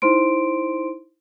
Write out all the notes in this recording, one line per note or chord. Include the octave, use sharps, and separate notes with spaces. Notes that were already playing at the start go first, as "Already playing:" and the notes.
D#4 E4 C5 C6 D7